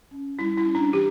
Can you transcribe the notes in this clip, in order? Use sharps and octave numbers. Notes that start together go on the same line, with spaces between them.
C#4
G3 E4
E4
C#4
D4
E3 G4